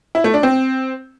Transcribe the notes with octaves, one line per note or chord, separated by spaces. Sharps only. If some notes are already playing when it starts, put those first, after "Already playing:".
E4
A3
D4
C4